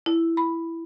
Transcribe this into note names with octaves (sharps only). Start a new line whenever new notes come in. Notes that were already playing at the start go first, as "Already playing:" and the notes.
E4
B5